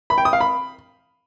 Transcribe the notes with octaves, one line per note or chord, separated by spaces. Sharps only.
B5
G5
D#6
F5
B5